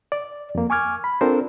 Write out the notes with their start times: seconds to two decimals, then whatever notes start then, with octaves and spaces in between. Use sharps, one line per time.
0.12 D5
0.55 F2 A#3
0.70 G#5 C#6 D6 F6 G#6
1.04 B5
1.21 C4 D4 F4 A4 A#4 C5